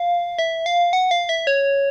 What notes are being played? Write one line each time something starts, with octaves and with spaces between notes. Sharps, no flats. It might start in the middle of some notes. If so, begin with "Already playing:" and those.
Already playing: F5
E5
F5
F#5
F5
E5
C#5